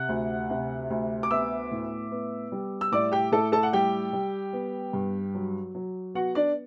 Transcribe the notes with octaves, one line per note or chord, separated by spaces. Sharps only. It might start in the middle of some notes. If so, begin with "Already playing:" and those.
Already playing: C3 F#5 F#6
D2
C3
D2
D6
B3 E5 E6
A2
B3
G3
E6
A2 D5 D6
G4 G5
A2 A4 A5
A4 A5
F#5
G3 G4 G5
G3
B3
G2
F#3
F#3
B3 F#4 F#5
D4 D5